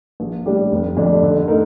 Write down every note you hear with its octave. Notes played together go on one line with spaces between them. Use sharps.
A#1
A2 G3 D4 G4
F1
F2 D3 A3 D4
D3
A3 D#4 A#4